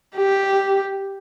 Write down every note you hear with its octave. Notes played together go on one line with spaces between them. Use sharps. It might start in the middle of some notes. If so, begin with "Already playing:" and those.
G4